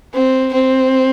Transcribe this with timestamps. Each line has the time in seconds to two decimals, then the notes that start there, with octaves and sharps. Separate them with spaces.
0.14 C4
0.53 C4